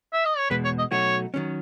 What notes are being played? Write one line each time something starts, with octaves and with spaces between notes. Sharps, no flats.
E5
D#5
C#5
E2 B2 G#3 B4
C#5
D#5
B2 F#3 A3 D#4 F#4 C#5
D#3 F#3 C#4